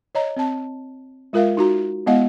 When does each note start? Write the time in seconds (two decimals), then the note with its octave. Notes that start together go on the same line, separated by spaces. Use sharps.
0.15 C#5 D#5 A#5
0.36 C4 A5
1.33 G#3 F4 A#4 E5 F5
1.57 D#4 F#4 A#5
2.07 G#3 B3 E4 D#5 F5 F#5